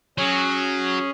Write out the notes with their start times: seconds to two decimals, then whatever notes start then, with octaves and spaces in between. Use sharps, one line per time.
0.18 F#3 C#4 G#4